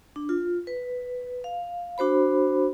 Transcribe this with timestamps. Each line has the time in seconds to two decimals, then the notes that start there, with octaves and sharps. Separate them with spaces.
0.16 D4
0.29 F4
0.67 B4
1.44 F5
1.98 D4 F#4 C5 B5